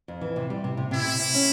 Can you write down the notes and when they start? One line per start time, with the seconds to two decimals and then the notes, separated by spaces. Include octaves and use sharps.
0.08 F2
0.21 E3
0.36 C3
0.50 G3
0.64 C3
0.77 C3
0.91 C3 E4
1.05 C3
1.19 C3
1.34 C#4